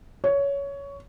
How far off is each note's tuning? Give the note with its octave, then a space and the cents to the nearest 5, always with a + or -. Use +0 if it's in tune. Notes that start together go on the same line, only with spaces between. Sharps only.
C#5 +15